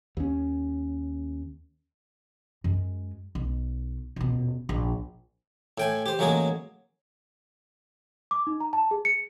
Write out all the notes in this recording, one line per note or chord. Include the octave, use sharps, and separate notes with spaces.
D#2 C#4
F#2 G#3
B1
D#1 B2
A#1
A2 G5 G#5
G4 C5
A1 F#3 G#3 A#3 G#4
D6
D#4
A#5
A5
G#4
C#7